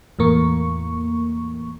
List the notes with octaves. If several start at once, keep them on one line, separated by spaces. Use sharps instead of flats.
E2 A2 A#3 C#6